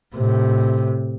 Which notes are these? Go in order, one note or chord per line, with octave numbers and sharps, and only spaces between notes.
A2 C3